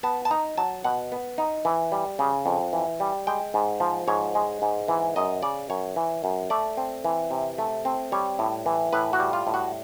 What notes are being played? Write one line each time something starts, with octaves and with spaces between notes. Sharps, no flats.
B3 A5
A5
D#4 A#5
F#3 A5
B2 F#5
B3
D#4
E3
G3
C#3
F2
E3
G3
G#3 G5
G#2
F3
G#2 C#5
G#3
G#2
E3
F#2 D#5
C#3 D5
F#2 C#5
E3
F#2
A3 D5
C4
E3
C3
A3
C4
G3 C#5
A2
E3
A2 B4
F#4
G3
F4
A2
F#4